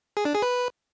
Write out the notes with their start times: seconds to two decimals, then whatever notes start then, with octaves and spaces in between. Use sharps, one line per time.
0.17 G#4
0.25 D4
0.34 G#4
0.42 B4